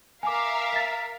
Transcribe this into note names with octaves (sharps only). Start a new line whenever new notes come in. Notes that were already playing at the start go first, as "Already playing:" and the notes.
A#4 E5 F5 G#5 D6
A6 B6